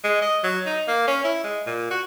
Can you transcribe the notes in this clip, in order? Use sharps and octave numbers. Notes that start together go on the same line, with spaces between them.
G#3
D#5
F#3
D#4
A#3
C#4
E4
G#3
A#2
F#4